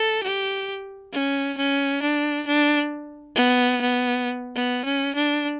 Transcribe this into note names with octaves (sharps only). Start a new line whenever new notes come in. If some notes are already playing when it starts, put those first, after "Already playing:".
Already playing: A4
G4
C#4
C#4
D4
D4
B3
B3
B3
C#4
D4